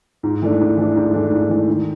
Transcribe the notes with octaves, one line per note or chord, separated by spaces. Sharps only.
G#2
E3 A3 D4
G#2
E3 A3 D4
G#2
E3 A3 D4
G#2
E3 A3 D4
D#3